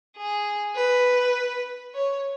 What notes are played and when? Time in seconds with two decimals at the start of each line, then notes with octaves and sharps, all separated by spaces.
0.17 G#4
0.76 B4
1.94 C#5